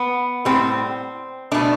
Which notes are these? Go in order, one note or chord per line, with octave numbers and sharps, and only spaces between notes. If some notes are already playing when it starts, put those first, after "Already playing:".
Already playing: B3
A2 G3 C4
B2 A3 D4